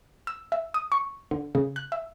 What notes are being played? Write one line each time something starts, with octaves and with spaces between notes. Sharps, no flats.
E6
E5
D#6
C#6
D3
C#3
F#6
E5